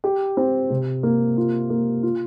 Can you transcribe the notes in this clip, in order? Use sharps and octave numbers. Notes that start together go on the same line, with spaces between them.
G4
C4
C3
A#3
F4
A#3
F4